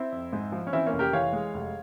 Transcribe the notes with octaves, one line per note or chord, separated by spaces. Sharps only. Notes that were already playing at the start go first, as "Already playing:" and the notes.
Already playing: C4 E4
F2
G#2
F3
C#4
E3 C4 E4
A#3 C#4
F1
G4 A#4
E3 C#5 F5
G#3
F1